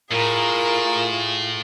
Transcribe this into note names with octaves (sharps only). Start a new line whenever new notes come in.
A2 F4 G#4 A#4 E7